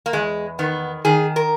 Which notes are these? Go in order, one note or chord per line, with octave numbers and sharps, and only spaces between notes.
A#3
E2 G#3
D#3 B3
D#3 G#4
A#4